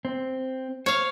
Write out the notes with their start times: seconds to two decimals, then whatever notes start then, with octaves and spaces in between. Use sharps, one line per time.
0.05 C4
0.86 C5 C#5 F5